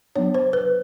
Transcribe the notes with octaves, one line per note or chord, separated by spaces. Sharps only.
F#3 B3 D4 C#5
C5
B4